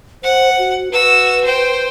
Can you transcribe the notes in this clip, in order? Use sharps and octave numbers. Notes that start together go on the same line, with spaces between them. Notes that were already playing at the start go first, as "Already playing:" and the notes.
C5 F#5
F#4
F#4 B4 E6
C5 G5